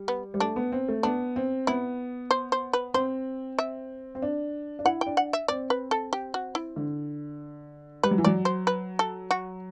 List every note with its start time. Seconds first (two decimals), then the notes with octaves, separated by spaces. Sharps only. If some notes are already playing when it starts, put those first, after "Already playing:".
Already playing: G3
0.08 B3
0.34 G3
0.40 A3 D4
0.56 B3
0.72 C4
0.88 A3
1.03 B3 D4
1.36 C4
1.67 B3 E4
2.31 C5
2.52 C5
2.73 B4
2.94 C4 C5
3.59 E5
4.15 C4
4.22 D4
4.79 D4
4.85 E4 F#5
5.01 G5
5.07 D4
5.17 F#5
5.33 E5
5.48 C4 D5
5.70 B4
5.91 A4
6.13 G4
6.34 F#4
6.55 E4
6.76 D3
8.03 G3 B4
8.11 F#3
8.18 E3
8.24 F#3 D5
8.45 C5
8.67 B4
8.99 A4
9.31 F#4